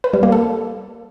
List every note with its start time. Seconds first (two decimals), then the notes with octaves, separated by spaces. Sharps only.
0.04 B4
0.13 G3
0.23 A#3
0.32 A4